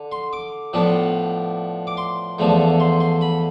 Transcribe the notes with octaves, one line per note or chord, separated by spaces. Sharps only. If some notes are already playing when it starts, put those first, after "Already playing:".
Already playing: D3
C6
D6
A2 F3 B3 D4
D6
C6
E2 D3 F3 A3
C6
C6
B5